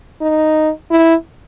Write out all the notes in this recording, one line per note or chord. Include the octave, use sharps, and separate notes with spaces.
D#4
E4